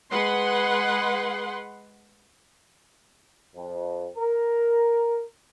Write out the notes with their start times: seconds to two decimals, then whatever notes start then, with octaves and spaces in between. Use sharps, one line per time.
0.12 G#3 B4 F#5 C6
3.55 F2
4.16 A#4